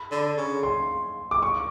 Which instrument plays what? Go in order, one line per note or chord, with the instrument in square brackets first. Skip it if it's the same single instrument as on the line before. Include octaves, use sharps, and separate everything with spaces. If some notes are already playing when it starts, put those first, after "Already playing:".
Already playing: [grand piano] B5
[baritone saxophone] D3
C#3
[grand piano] C6
D6
C#6